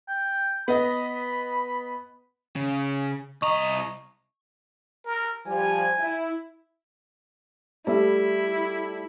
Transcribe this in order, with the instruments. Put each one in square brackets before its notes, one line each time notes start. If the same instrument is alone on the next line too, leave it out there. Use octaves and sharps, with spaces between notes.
[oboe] G5
[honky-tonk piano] B3 D#5 [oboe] B5
[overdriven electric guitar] C#3
[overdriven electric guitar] C2 A#5 [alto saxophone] D#5 [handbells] C#6
[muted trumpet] A#4
[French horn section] F3 G3 [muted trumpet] G#5
[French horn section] E4
[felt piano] G3 A3 E5 [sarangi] E4